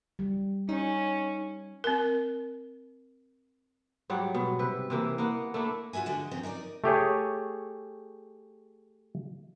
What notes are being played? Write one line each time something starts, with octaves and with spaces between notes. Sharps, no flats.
G3
C#4 D#4
C4 A#4
G#2 F#3 G3 F#5
B2
C3 B4
C3 E3 A#3
A#3 B3 F#5
A3 A#3 D4 E4
F4 F#4 G#4 E5 G#5
D3 G#3
F2 D3 D#3 C4 C#4
D#4 A#4 C#5 D5
A3 G4 G#4 C#5